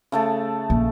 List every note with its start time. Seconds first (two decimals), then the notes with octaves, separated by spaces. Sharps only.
0.12 C#3 A3 A5
0.70 A#1 A#2